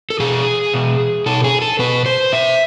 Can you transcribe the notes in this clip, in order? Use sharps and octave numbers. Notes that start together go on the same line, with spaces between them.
A4
B2 G#4
B2
B2 A4
G#4
A4
B2 B4
C5
B2 E5